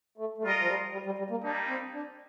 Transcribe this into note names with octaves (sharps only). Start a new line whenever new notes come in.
A3
A3
G3 F4 A#4 D#5
F3
G3
G3
G3
G3
A#3
G3 A#3 D4 D#4
C4
D4